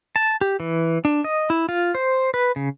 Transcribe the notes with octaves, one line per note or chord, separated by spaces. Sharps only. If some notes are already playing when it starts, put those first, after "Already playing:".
A5
G4
E3
D4
D#5
E4
F4
C5
B4
C#3